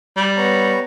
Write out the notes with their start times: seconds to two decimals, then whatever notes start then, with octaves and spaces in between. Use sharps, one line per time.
0.16 G3
0.37 B3 C#5 A#5